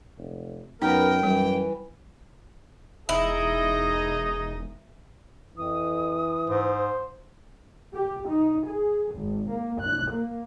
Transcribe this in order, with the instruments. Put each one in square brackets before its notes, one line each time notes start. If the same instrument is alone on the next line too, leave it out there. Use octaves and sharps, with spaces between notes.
[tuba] F1
[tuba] F#2 [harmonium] B3 A#4 [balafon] D#4 [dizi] G5
[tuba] F#2 [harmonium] E3 [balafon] G3
[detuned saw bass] E1 [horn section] D#4 D#5 [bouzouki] E4 [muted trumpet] G#4
[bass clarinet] F2 [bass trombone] E3 [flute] D#6
[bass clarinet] G#2 [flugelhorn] C5
[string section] G4
D#4
G#4
G#1
A#3
F#6
A#3